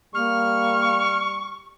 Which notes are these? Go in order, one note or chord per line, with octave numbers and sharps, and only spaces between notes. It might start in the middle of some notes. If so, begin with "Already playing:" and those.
G3 A#3 C#6 F6